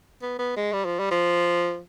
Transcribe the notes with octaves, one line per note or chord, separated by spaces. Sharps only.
B3
B3
G#3
G3
F3
G3
F3